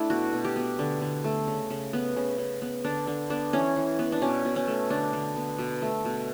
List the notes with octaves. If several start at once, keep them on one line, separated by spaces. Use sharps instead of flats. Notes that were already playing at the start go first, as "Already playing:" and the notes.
Already playing: A3 D4 E4
B2 F#4
B2
G4
B3
D3
D3
A3
C#3
C#3
B3
C#3
C#3
B3
D3 D4
D3
B3 D4
E3 C#4
E3
B3
D4
B2 C#4
B2
C#4
A3
D3 D4
D3
B3
B2
A3
B2